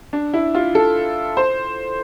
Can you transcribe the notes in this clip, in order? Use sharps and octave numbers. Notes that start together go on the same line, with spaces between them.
D4
E4
F4
A4
C5